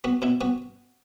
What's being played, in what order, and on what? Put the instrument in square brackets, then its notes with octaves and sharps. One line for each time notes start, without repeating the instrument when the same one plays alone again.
[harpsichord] B3 F#4
B2 E4
B3 F#4